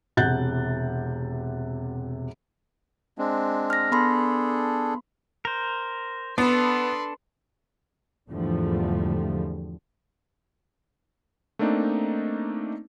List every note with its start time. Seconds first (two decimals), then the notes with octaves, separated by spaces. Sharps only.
0.17 E1 C3 F#5 F#6 G6 A6
3.18 G#3 C4 D4
3.70 F6 A#6
3.92 B3 D4 G#4 A4 B5 C6
5.45 A#4 C5
6.38 B3 D4 A4 B4 C6
8.30 E2 G#2 D3 F3 G3 A3
11.59 A3 A#3 C4 D4 D#4